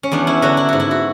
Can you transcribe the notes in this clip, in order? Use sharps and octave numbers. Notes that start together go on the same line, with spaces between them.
C#4
E2 B3 D4
C#4 E4
D3 F#3 D4 F#4
E4
G#2 F#4
E4
F#4